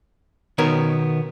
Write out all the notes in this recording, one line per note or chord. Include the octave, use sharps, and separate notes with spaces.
B2 D#3 B3 A#4 C#5